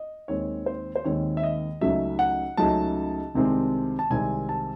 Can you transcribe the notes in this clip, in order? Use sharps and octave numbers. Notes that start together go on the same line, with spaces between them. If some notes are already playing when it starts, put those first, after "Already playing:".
Already playing: D#5
D#2 D#3 G#3 C4 C#5
C5
C5
D#2 D#3 G#3 C4 C#5
E5
D#5
C#2 C#3 F#3 A3 D#4 E5
F#5
C#2 C#3 F#3 A3 D#4 A5
C2 C3 D#3 G#3 C4
A5
C2 C3 D#3 G#3 C4 G#5
A5